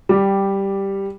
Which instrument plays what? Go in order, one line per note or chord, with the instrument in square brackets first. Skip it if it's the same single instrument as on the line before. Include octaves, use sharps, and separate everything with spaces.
[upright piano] G3 G4